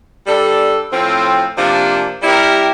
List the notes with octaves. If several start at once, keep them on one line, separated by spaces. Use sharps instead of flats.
G3 D4 A4
A2 F3 C4
C3 F3 A#3 D4
G3 C4 E4 G4 A#4